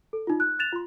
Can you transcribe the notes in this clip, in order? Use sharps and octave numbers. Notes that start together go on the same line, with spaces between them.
A4
D#4 F4
F#6
F#6 A6 E7 F7
F4 C6